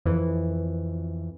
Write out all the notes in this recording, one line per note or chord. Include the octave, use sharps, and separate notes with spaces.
F2 E3